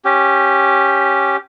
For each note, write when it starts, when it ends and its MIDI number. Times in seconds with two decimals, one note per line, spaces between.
0.05 1.37 61
0.05 1.37 67